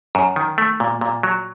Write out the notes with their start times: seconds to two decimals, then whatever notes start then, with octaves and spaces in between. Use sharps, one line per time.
0.15 F#2
0.36 D#3
0.58 A3
0.80 A#2
1.01 A#2
1.23 F#3